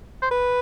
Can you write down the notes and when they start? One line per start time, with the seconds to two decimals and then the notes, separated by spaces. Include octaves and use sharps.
0.22 C5
0.31 B4